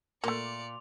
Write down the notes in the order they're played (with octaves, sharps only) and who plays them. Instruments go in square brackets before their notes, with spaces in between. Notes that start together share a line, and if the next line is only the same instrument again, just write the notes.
[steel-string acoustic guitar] A#2 [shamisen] A3 A#3 [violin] D5 C#7 [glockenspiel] C6 D6 F7